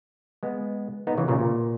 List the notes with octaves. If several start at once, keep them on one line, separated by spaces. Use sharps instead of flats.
G#3 B3
B3 D#4
C#3 E3
A#2 C#3
A#2